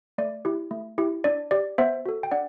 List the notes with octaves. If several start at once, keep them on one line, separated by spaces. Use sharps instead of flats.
A3 D5
E4 G4
A3
E4 G4
D4 D5
G4 D5
B3 C5 E5
F#4 A4
G5
D4 D5 F#5